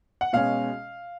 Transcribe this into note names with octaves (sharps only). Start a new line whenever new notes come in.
F#5
B2 G#3 C#4 F5